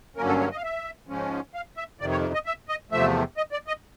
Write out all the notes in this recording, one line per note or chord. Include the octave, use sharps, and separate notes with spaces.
G2 D3 F#3 A#3 C#4 A#4
A4
C#5
D#5
F5
E5
G#2 F3 G#3 C#4
F5
E5
F2 C3 D#3 D5
C#5
D#5
E5
D#5
E2 C3 F3 A3 E5
D#5
D5
D#5